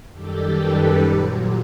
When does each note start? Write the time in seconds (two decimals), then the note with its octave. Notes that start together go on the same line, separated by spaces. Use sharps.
0.12 F#2 D#3 G3 G4 A4
0.55 A4 B4
0.98 A#2 F#3